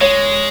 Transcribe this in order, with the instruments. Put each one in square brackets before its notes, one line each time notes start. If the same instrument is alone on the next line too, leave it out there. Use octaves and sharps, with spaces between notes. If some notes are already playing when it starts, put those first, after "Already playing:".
[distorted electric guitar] G#3 [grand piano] C#5